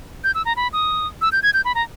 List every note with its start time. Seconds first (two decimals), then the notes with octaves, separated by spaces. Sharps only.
0.24 G6
0.35 E6
0.45 A#5
0.56 B5
0.73 D#6
1.22 E6
1.32 G6
1.43 G#6
1.54 G6
1.65 B5
1.75 A#5